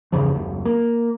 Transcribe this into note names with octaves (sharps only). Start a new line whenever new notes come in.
E2 G2 C#3 F3
F#1 D#2
A#3